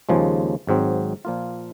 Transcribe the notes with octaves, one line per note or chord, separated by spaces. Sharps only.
D#2 C#3 F3 G#3
G#1 G#2 F#3 C4
A#2 F3 A#3 F4